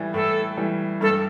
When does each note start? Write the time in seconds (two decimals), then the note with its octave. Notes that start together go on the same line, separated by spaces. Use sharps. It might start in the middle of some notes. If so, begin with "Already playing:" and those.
Already playing: A2 E3 G3
0.14 A2 A4
0.57 E3 G3
1.01 G2 A4